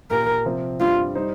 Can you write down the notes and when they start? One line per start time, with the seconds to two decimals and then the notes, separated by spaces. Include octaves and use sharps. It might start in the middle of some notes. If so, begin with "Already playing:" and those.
0.11 A#2 A#3 G4 A#4
0.45 C3 F3 C4
0.80 G2 G3 C4 F4
1.15 G3 D#4 C5